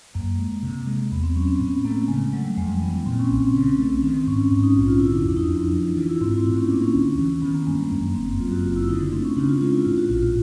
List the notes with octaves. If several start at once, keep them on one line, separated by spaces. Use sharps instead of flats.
F#2 A#3
G#3
C3
G#3
E2 B3
C4
F#3 C#4
C4
A2 B3
A3 A#3
C#3 G#3
F#3 A3
G3
F2 G#3
E3 B3
A#2 C4
C#4
B1 C4
C#3
A3
D#3 C4
G#2 C#4
G#2 C#4
D#4
A#1 F4
F4
D3 E4
D4
F2 D4
D#4
F2
F3
E3 F4
E4
G#2 C4
E4
A2 D4
C#4
A#3 D4
C#4
D2
E3
D#3 B3
A#3
G2 G#3
G#3
F#2 A#3
F#1 C4
F#2 F4
F#4
F#1 F4
E4
D3 D#4
D4
A3 C4
C#4
C#3 D4
F4
G#3 F4
E4
A2 F4
F#4
A#1 F4
F4